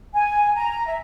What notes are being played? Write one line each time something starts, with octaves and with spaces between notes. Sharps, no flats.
G#5
A#5
E5